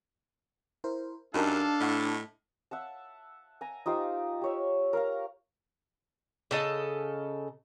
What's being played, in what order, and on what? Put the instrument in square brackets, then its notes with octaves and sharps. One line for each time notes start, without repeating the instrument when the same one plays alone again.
[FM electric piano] E4 A#4 C5
[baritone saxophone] F#2 [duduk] D4 [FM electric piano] D#4 G4 A#4 [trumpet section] A4 F5 A5
[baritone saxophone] A2 [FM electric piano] D#5 F#5 C#6
[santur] E5 F#5 A5
G#5 A#5
D#4 F4 G4 C5
G4 C#5 E5
A#4 F5 A#5
[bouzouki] C#3 A4 D#5